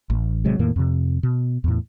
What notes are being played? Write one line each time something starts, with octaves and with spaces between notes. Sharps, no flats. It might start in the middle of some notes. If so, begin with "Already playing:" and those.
A1
A1 C3 F#3 G#3
E2 A2 D#3 A#3
F2 C3
B2
E2 A2